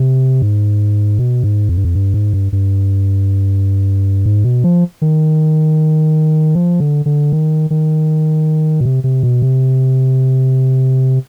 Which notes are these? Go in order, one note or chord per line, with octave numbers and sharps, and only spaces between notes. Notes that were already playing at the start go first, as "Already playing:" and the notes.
Already playing: C3
G#2
B2
G#2
F2
G2
F2
G2
G#2
G2
G2
G#2
B2
F3
D#3
F3
D3
D3
D#3
D#3
B2
C3
C3
B2
C3